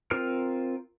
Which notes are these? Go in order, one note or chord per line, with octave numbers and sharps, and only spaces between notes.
C4 F4 A#4 F6